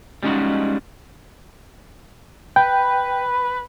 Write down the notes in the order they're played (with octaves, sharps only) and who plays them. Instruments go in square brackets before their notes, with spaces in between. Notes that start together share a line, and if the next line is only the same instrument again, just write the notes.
[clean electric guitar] G3 G#3 C#4 D#4 F4 F#4
[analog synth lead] B4 [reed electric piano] G5